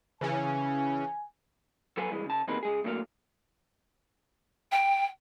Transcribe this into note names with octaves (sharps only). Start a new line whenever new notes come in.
C#3 E3 C#4 G#5
F#3 A4 B4 F5 G#5
G2 E3 G#3
C#3 A5
E2 C3 D#3 G#3 A#3 B4
C#2 G#3 G#4
A2 D3 F#3 A#3 D5 F5
G5